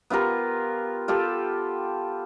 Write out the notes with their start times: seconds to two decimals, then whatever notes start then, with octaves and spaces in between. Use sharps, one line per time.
0.10 B3 F4 G4 A#4
1.08 F4 G4 A4